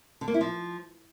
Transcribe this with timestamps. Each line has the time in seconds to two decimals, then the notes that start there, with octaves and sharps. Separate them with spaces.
0.21 D3
0.28 A#3
0.34 E4
0.41 F3